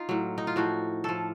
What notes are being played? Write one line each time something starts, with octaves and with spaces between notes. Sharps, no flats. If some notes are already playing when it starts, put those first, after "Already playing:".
Already playing: D#4 F4
A2 F#3
D#4
F4
A2 F3 F#4
A2 F3 A4